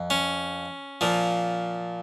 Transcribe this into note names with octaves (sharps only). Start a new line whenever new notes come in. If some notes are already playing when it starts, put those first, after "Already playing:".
Already playing: F2
C#4
A#2 F3